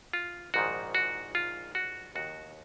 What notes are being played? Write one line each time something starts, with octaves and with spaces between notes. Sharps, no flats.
F4
A#1 G#2 D#3 F#4
F#4
F4
F#4
D#2 D#3 F#4